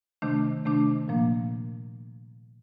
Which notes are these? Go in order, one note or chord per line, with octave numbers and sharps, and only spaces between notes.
C3 D#3 A3 D4
C3 D#3 A3 D4
A#2 F3 A#3